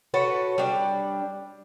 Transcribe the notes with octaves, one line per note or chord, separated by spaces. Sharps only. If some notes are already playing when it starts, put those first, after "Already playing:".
F#4 A4 B4 C#5
G3 D4